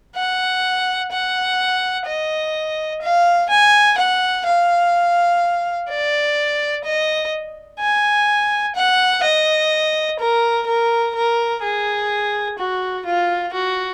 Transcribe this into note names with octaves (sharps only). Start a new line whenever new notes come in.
F#5
F#5
D#5
F5
G#5
F#5
F5
D5
D#5
G#5
F#5
D#5
A#4
A#4
A#4
G#4
F#4
F4
F#4